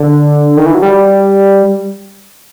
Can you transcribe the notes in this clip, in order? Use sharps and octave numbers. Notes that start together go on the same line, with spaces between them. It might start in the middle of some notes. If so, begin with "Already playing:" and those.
Already playing: D3
D#3
E3
F#3
G3